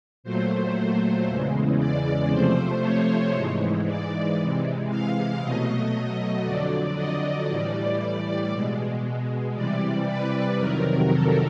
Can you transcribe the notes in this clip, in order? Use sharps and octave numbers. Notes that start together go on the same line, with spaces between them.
A#2 F#3 A3 C5
E2 C#3 E3 G#3
D5
C3 F3 A3 C5
C#5
G#2 E3 G#3
D5
C3 E3 G#3
F5
B2 F#3 A3 D#5
F2 D3 F#3 D5
D#5
A2 E3 G3 D5
B2 G#3
C3 E3 G3 D5
B4
F2 C3 D#3 F#3 A#4
A4